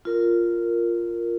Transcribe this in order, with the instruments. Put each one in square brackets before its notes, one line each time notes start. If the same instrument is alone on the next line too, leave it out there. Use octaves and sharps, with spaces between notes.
[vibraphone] F4 A#4